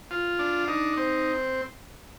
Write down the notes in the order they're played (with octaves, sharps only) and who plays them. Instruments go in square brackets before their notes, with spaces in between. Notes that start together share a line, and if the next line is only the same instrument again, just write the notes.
[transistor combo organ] F4
D4
D#4
C4